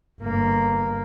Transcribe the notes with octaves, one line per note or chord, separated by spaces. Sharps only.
G1 A#3